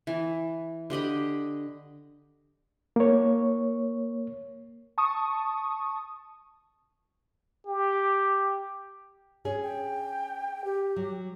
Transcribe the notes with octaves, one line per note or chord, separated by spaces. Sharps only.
E3
D3 G4 D#5 B5
A#3 C#5
A5 C#6 D#6
G4
C#4 G#4 C#5
G5
G4
F#3